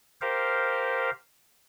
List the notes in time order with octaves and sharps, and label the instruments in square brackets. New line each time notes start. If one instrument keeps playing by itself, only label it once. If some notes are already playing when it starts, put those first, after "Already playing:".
[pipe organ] G4 A#4 C5 F5